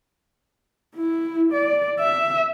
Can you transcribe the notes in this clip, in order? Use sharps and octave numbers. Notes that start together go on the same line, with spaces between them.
E4
D5
E5